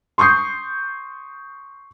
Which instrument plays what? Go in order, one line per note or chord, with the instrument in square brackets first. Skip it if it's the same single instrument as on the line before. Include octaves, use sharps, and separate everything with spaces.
[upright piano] C6 C#6 D#6 G6 C7